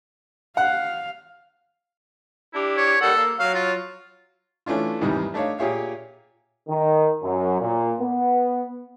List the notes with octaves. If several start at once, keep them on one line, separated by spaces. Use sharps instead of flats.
F5 F#5
D4 E4 G4
C#5
D#2 G3 A4 F#5
A#3
F#3 F5
F4
E3 A3 C#4 D4 F4
E2 G#2 C3 D#3 E3 G3
A3 D4 D#4 C#5 F5
A#2 G4 G#4 C#5 E5 F5
D#3
F#2
A#2
B3